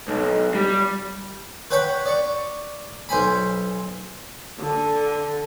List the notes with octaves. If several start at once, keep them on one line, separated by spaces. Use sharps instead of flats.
B1
G3
B4 C#5 F#5 G5 B5 C#6
D5 C#6
B1 C5 G#5 B5
D3